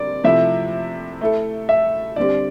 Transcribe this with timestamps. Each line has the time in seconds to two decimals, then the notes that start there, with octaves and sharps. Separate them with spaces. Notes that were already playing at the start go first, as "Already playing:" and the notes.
Already playing: D3 G3 C4 A#4 D5
0.24 C3 F3 A3 E4 E5
1.21 A3 E4 A4
1.69 E5
2.16 D3 G3 C4 G4 D5